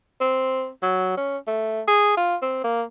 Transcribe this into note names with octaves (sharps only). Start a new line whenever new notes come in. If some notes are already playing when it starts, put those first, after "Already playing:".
C4
F#3
C#4
A3
G#4
F4
C4
A#3